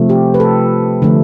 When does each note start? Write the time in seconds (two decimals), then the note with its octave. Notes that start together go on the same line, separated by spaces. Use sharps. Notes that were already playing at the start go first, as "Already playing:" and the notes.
Already playing: C3 F3 A3
0.09 G4
0.34 B4
0.40 A4
1.02 D3 F3 A3